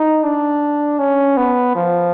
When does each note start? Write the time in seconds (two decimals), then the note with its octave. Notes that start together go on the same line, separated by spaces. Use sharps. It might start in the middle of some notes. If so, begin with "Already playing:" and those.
Already playing: D#4
0.24 D4
0.99 C#4
1.37 B3
1.76 F3